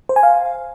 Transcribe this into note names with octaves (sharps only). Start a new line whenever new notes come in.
C5
G#5
F5